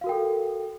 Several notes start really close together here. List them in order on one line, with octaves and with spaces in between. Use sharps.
F5 F#4 A#4 G5 A4